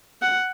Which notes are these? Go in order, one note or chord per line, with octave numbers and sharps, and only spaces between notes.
F#5